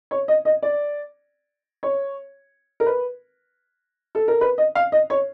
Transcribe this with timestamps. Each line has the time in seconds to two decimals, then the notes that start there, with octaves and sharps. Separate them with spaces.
0.11 C#5
0.28 D#5
0.45 D#5
0.63 D5
1.83 C#5
2.80 A#4
2.86 B4
4.15 A4
4.28 A#4
4.41 B4
4.58 D#5
4.75 F5
4.92 D#5
5.10 C#5